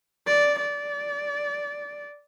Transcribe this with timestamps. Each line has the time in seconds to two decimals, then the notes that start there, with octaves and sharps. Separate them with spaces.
0.27 D5
0.61 D5